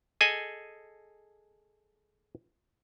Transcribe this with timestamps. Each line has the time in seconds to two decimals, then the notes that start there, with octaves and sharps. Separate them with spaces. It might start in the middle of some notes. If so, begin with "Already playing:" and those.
0.21 G#4 A4 D#5 G#5